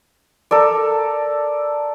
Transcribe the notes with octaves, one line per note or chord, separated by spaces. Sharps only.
A4 A#4 D5